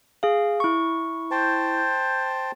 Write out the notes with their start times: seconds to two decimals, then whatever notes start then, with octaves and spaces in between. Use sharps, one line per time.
0.23 G#4 F5
0.60 E4 C#6
1.31 C5 G5 A5